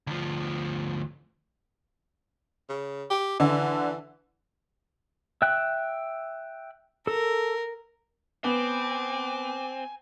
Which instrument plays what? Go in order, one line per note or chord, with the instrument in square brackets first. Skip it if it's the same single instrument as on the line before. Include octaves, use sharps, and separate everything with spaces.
[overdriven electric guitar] D2 F3
[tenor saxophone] C#3
G4
[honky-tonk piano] D3 [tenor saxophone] E3
[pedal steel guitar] E5 G5 F#6
[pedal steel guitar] A4 [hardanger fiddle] A#4
[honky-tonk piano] B3 [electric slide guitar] C4 [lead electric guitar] G#5 [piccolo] D6